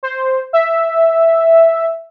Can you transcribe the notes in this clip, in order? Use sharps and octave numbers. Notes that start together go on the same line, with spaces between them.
C5
E5